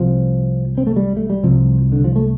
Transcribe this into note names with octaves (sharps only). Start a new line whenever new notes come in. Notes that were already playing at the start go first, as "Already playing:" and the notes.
Already playing: C2 C3 F3
C4
A3
G3
A3
G3
C2 C3 F3
D3
F3
A3